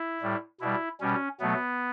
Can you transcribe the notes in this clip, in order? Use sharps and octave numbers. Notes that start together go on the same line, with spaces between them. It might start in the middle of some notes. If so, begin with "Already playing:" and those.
Already playing: E4
A2 G3
B2 G3 E4
B2 G3 C#4
B2 F#3 A3 B3